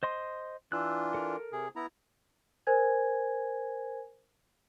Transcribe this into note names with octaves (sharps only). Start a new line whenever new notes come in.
C5 D#5 C6
E3 D4 F4 E6 F#6
A4 A#4
C3 G#4
B3 E4 A#5
A#4 C5 G#5 G#6